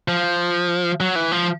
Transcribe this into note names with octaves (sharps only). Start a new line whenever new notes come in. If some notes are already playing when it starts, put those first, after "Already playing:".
F3
F#3
E3
F3